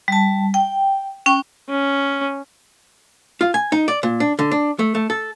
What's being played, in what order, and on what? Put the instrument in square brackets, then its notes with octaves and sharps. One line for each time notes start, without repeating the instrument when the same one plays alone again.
[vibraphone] G3 A5
G5
C#4 G5 C#6
[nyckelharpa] C#4
[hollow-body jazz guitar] F4
G#5
D#4
D5
A#2
D4
D3
D4
A3
A3
A4